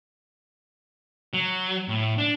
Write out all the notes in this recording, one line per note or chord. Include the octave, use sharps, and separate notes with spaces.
F#3
A2
D4